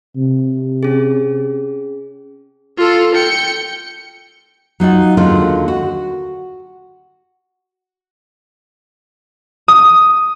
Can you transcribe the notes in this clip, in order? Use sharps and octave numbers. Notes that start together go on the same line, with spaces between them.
C3
C#4 G#4
F4 A4
G5 C#7
F#3 D#4 F4 F#5
D#2 D3 F#3 G#3 F4
F#4
D#6